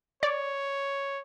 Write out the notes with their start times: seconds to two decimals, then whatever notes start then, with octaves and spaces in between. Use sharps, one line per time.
0.23 C#5 D5